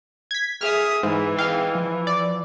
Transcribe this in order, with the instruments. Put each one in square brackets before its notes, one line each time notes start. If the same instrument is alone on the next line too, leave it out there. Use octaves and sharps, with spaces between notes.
[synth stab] G#6 B6
[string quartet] G#4 E5 D#6 [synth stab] F6
[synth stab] G#2 [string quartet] E3
[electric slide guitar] G#4 D#5 G5 [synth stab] F5
[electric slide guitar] F3
[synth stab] D5